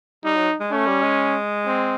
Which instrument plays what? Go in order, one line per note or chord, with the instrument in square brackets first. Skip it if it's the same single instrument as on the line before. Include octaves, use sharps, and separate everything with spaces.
[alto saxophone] G3 [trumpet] D#4
[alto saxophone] F#3
G#3
[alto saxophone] A3 [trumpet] C#4
[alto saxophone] G3
G#3
[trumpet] C4